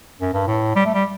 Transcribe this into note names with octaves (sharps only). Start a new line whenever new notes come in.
F#2
G2
A2
G3
A3
G3